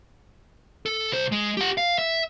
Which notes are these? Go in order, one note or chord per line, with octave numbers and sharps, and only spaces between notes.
A4
C2 C5
G#3
G4 F#5
F5
E5